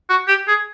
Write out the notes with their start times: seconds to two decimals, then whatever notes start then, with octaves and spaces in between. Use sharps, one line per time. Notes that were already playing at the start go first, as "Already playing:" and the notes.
0.10 F#4
0.28 G4
0.48 G#4